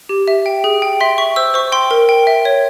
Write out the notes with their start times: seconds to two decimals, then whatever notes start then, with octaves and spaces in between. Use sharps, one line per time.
0.09 G4
0.28 E5
0.46 G5
0.64 G#4
0.82 G5
1.00 E5 C6
1.18 E5 C#6
1.36 C5 E6
1.54 C5 C#6
1.72 G5 C6
1.91 A#4
2.09 G5
2.27 E5
2.45 C#5